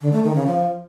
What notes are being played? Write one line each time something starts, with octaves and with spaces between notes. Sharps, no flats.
D3
A3
D#3
C#3
F3